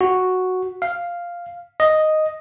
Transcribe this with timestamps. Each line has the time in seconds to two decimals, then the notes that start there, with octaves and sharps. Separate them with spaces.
0.01 F#4
0.82 F5
1.80 D#5